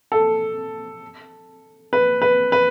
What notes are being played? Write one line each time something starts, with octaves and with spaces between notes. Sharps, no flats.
A4
B4
B4
B4